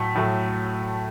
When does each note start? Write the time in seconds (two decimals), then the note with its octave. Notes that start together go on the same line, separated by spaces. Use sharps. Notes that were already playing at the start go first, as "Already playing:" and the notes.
Already playing: A2 F#3 A3
0.15 A2 F#3 A3